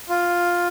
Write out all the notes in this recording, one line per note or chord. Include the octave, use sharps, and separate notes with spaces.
F4